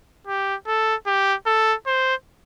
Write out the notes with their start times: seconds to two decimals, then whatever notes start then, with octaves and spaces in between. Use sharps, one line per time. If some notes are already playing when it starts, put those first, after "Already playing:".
0.27 G4
0.67 A4
1.07 G4
1.47 A4
1.87 C5